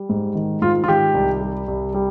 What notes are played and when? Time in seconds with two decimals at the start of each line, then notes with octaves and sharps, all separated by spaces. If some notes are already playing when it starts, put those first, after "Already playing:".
Already playing: G3
0.09 G#2
0.35 D#3
0.62 G#2 F4
0.84 F4
0.88 D#3 G4
1.14 C2
1.41 G3
1.68 C2
1.94 G3